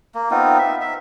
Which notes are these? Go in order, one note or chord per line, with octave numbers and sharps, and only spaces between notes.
A#3
B3 C4 D#4 F4
E5
E5